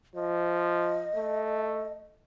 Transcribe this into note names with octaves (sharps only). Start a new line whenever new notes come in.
F3 D#5
A3